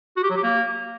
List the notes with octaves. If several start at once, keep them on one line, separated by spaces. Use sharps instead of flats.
F#4
G4
F#3
G4
A#3